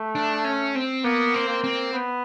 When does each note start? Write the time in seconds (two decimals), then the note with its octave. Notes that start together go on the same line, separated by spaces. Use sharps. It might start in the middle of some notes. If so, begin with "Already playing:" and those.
Already playing: A3
0.15 D4
0.45 C#4
0.75 C4
1.04 A#3 B3
1.34 C4
1.48 A#3
1.64 C4
1.93 B3